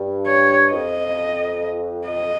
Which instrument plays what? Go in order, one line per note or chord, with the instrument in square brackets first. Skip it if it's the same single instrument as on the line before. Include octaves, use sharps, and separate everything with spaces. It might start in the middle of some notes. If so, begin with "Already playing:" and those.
Already playing: [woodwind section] G2
[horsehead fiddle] C#5
[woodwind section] F2 [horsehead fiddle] D#5
[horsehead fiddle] D#5